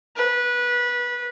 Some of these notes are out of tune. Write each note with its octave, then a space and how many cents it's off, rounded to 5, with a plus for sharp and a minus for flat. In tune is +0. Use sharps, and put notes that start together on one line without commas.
B4 -20